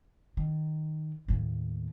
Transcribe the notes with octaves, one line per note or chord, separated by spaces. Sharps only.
D#3
D#2 A2